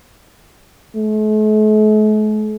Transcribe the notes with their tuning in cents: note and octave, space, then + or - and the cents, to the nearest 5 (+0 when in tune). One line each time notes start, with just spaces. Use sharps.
A3 -45